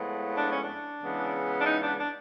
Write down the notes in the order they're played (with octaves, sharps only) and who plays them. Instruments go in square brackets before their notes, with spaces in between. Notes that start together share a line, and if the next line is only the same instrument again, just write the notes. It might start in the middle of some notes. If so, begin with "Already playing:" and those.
Already playing: [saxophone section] A2 F3 G#3 B3
D4
C#4
D4
C#3 E3 G#3 B3
D4
D#4
D4
D4